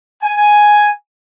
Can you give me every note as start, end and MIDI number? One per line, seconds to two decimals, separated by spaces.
0.22 0.90 80